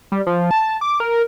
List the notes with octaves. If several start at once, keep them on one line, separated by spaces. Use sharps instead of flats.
G3
F3
A5
D6
A#4